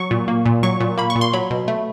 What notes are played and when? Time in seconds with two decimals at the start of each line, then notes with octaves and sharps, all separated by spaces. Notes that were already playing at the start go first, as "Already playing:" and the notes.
Already playing: F#3 C#6
0.11 A#2
0.28 A#3
0.46 A#2
0.63 F#3 C#6
0.80 A#2
0.97 A#3 B5
1.10 C#6
1.15 A#2
1.21 C6
1.33 F#3 B5
1.51 B2
1.68 A3